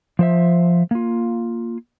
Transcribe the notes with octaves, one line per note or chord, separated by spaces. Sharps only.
F3 C5 E5
A#3 F4